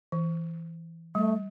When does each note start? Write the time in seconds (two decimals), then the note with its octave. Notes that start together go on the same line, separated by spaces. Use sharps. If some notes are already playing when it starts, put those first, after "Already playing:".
0.12 E3
1.15 G3 A3